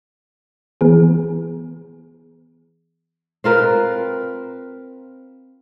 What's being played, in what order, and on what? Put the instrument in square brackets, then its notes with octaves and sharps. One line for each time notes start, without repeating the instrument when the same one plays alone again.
[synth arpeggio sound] E3 B3 G#4
[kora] C4 F4 A#4 B4